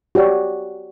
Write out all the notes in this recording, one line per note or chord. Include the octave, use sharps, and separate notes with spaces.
F#4 G4 C#5 D5